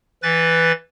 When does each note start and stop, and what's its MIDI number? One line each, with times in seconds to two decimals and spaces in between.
0.23 0.72 52
0.23 0.72 71
0.23 0.72 93